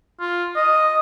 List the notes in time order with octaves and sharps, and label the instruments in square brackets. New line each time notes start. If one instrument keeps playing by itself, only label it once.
[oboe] F4
D#5